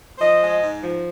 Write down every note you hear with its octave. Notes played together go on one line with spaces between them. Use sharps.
F3 C5 D#5
G#3
G#2
F3